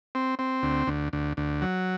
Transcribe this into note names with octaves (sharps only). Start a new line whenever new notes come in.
C4
C4
D2
D2
D2
D2
F#3